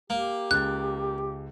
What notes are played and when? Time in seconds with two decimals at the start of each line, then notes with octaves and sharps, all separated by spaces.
0.10 A#3 G4
0.51 C#2 C#3 F#6 A6